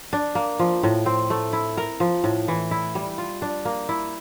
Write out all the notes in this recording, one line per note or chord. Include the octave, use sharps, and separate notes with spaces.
D4
A#3
F3
A2
C4
A3
E4
A#4
F3
A2
E3
E4
G3
F4
D4
A#3
E4